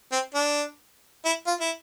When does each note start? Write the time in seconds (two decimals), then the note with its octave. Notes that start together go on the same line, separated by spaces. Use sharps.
0.12 C4
0.35 D4
1.25 E4
1.47 F4
1.61 E4